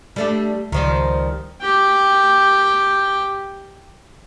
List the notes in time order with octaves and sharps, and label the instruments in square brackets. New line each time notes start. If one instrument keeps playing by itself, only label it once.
[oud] G3 A3 D4
[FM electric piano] C#2 [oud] D#3 F3 G3
[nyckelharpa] G4 G5